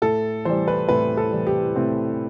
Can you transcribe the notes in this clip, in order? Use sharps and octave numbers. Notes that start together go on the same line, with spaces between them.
A2 A4
E3 G3 C5
B4
A2 B4
A4
E3 G3
G4
A2 C4